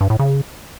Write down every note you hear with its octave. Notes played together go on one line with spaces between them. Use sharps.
G2
A2
C#3